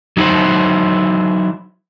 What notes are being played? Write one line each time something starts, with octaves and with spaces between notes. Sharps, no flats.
F#3 D#4 E4 F#4 C5